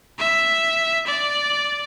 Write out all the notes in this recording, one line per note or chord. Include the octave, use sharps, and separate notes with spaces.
E5
D5